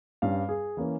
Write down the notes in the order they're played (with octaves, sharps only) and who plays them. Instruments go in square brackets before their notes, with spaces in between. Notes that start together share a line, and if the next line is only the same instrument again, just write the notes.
[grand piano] G2 G3 C#4 F5
G#4
E3 A#3 C#4